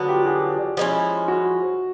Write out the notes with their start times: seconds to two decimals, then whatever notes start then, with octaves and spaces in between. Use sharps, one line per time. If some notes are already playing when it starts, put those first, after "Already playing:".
Already playing: D3 F#3 B3 D4 F#4
0.08 F4 G4
0.25 F#4 G#4
0.77 F3 G#3 C#4 E4
1.28 F#4